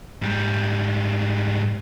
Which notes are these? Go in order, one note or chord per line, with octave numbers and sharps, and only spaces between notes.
G#2 G3